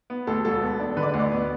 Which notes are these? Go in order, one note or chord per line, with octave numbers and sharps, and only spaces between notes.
B3
D2 A4
E1 A4
B3
D4
D3 B4
D5
B4
D2
D5
B3